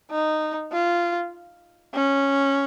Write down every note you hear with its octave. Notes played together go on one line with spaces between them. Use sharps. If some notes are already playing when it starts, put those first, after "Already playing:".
D#4
F4
C#4